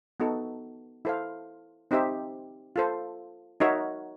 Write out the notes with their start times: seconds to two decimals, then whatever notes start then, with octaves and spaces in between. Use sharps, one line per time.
0.20 B3 D#4 F#4 A4
1.05 E4 A4 C5 F5
1.91 C4 D#4 G4 C5 E5
2.76 F4 A4 C5
3.60 D#4 F#4 A#4 C#5 E5